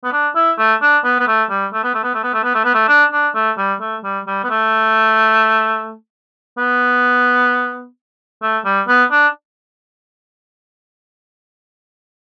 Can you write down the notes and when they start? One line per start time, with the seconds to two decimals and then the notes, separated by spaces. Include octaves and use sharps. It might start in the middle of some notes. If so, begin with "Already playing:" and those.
0.04 B3
0.13 D4
0.35 E4
0.58 A3
0.82 D4
1.04 B3
1.19 B3
1.28 A3
1.50 G3
1.73 A3
1.84 B3
1.94 A3
2.04 B3
2.14 A3
2.24 B3
2.34 A3
2.44 B3
2.55 A3
2.65 B3
2.74 A3
2.89 D4
3.12 D4
3.35 A3
3.58 G3
3.81 A3
4.04 G3
4.27 G3
4.44 B3
4.50 A3
6.58 B3
8.43 A3
8.65 G3
8.88 B3
9.11 D4